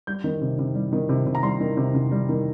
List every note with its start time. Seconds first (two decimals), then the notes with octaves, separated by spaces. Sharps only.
0.07 G3 G6
0.24 D#3
0.41 C3
0.59 C3
0.75 G3
0.93 D#3
1.09 C3
1.26 C3
1.35 A#5
1.43 G3 C6
1.60 D#3
1.77 C3
1.95 C3
2.11 G3
2.29 D#3